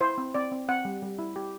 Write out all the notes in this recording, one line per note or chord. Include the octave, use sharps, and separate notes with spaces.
E4 C5
C4
C4 D5
C4
C4 F#5
G3
G3
E4
G4